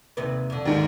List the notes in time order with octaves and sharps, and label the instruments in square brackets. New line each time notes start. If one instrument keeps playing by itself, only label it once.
[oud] D#2 C3 B4
F2 D3
[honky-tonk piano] D#2 G#2 D#3